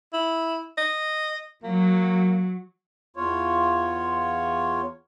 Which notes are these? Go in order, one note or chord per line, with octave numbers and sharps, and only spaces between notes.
E4
D#5
F#3 A#3
E2 F4 C#5